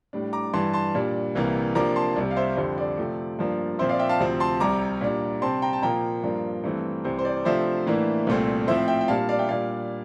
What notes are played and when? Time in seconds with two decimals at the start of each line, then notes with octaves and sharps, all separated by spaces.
0.13 A2 G3 D4
0.33 A#5 D6
0.53 G2 E3 G3 A5 C6
0.73 A5 C6
0.95 A#2 G3 D4
1.35 C2 C3 E3 A#3
1.75 C3 F3 A#3 D4 A#5 D6
1.96 A5 C6
2.16 C2 C3 G3 D5
2.31 F5
2.36 C5 E5
2.57 F2 D3 G3 C5
2.78 D5
2.98 C3 F3 A3
3.39 G2 F3 A#3 D4
3.79 A#2 F3 C4 C5 E5
3.89 D5 F5
3.99 E5 G5
4.09 F5 A5
4.20 D2 C3 F3 C4
4.40 A5 C6
4.60 C2 C3 G3 A#5 D6
5.01 A#2 G3 D4
5.42 C3 G3 C4 A5 C6
5.62 G5 A#5
5.73 A5
5.82 A#2 F3 A#3 G5 A#5
6.24 G2 F3 A#3 D4
6.64 G2 E3 A3 C4
7.04 C2 C3 E3 C5
7.19 C5
7.25 D5
7.45 C3 F3 A3 D4 C5 E5
7.86 A2 E3 A#3 D4
8.27 C2 A#2 A3 C4
8.67 A2 F3 C4 C5 E5
8.88 E5 G5
9.01 G5
9.08 A#2 G3 D4 F5 A5
9.29 D5 F5
9.39 E5 G5
9.49 A#2 G3 D4 D5 F5